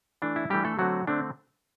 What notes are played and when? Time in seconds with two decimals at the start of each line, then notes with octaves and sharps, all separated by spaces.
0.22 E3 A3 D4
0.36 E4
0.50 E3 G3 A3 D4 G4
0.65 A3 A4
0.79 D3 F#3 A3 C4 F#4
1.07 D3 A3 C4 D4